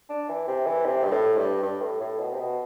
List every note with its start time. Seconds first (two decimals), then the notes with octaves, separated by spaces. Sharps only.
0.10 D4
0.29 E3
0.48 C3
0.67 E3
0.86 C3
1.04 G2
1.12 A2
1.37 G2
1.63 G2
1.81 A2
2.01 A2
2.20 B2
2.32 C3
2.39 B2